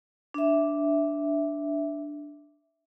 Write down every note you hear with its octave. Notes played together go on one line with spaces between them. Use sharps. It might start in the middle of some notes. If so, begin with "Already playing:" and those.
D4 E5